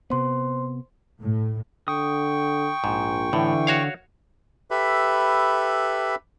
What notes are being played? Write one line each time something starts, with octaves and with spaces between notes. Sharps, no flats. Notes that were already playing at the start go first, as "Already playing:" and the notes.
C3 B3 C5 C6
A2
D3 G5 C#6 D#6
A#1 G#2
A2 D3 E3
F#4 C#5 F5
G4 A4 B4 E5 B5